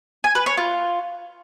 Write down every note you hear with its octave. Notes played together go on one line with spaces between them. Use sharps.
G#5
B4
C#5
F4